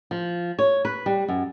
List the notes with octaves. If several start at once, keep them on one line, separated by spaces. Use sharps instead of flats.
F3
C#5
B4
G3
F#2